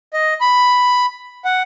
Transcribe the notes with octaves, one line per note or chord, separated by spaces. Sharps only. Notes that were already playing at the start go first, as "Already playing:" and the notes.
D#5
B5
F#5